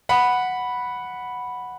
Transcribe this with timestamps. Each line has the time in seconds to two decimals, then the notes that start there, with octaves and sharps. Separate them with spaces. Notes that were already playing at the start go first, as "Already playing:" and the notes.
0.09 F#5 B5